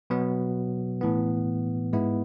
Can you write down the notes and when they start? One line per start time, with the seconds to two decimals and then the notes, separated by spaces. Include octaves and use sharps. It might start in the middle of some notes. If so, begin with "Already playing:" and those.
0.10 B2 F#3 B3
1.01 A2 E3 B3
1.93 G#2 G#3 B3 E4